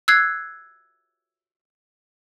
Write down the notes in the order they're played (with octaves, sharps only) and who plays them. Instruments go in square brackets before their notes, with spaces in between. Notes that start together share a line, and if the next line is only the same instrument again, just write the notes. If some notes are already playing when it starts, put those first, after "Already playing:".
[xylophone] E6 F#6 G#6 C7